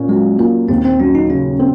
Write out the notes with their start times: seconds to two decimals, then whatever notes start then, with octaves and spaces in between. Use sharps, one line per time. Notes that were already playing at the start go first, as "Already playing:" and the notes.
Already playing: A#2 C#4
0.08 F#3 G#3
0.39 A#3 F4
0.69 D#2 C4
0.85 C4
0.99 F#3 C#4
1.15 D#4
1.30 C#3 C#4
1.59 C4